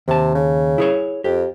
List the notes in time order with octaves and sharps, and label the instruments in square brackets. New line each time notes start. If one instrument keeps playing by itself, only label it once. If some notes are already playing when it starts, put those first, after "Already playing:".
[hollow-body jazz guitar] D#2 A5 [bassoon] C3
[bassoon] C#3
[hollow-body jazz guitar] E4 G#4 C#5
[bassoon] F2 [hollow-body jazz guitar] G4